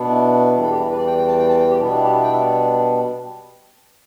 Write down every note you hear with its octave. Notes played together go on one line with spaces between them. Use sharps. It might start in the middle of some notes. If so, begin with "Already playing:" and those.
Already playing: B2 B3 D4
E4
E2 E3 G3 D4
A4
G4
E4
D4
B4
D5
G5
G5
A5
G5
A5
G5
G4
B2 G3 B3 D4
E4
G4
E4
G5
E5